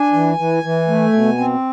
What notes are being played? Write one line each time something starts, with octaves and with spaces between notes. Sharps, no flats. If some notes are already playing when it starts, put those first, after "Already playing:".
Already playing: D4 G#5
E3
E3
E3
A3
B2
C4